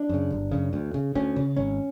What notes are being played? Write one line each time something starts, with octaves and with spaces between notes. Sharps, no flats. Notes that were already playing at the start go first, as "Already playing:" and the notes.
Already playing: D4
F#2 C#3
G1
F#2 C#3
D2
C#3
D2 C#4
C#3
G#1 C#4